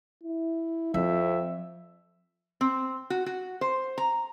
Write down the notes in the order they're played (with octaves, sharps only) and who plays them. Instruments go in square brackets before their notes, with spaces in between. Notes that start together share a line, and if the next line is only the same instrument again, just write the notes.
[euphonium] E4
[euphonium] F2 [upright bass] F3 [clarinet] E5
[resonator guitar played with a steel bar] C4
F#4
F#4
C5
A#5